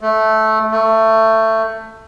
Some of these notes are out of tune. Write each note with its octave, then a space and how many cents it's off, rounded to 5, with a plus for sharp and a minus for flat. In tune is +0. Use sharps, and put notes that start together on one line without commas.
A3 -10
A3 +15